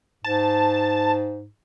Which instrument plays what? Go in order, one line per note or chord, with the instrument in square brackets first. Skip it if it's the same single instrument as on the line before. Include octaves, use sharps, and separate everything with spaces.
[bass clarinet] G#2 [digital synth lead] A5